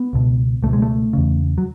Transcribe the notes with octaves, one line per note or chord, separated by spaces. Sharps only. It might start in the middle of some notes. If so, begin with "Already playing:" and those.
Already playing: B3
C#2 B2
C#2 B2 A3
G#3
A3
E2 C#3
F#3